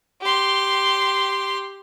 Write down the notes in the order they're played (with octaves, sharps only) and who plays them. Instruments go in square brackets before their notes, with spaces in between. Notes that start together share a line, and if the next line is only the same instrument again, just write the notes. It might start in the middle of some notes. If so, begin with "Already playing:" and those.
[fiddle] G4 C6